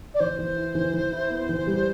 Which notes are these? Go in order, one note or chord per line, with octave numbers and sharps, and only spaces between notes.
D5
E3 C5
E3
E4
E3
E3
E4
B3
E3
G3